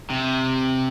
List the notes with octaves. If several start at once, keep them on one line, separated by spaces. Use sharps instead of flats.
C3